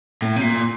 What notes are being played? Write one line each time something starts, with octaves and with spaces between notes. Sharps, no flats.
A2
C3
A#2